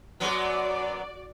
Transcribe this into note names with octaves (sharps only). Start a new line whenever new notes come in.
F#2 F#3 B3 F#4 D5